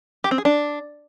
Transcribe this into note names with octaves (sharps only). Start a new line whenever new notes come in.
G4
C4
G#4
D4